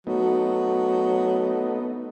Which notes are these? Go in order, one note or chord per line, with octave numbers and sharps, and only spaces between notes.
F#3 A3 B3 D#4